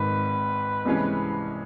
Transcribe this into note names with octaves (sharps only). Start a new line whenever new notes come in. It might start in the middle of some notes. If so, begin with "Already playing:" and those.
Already playing: G#1 G#2 D#3 B4
C2 C3 E3 G#3 C#4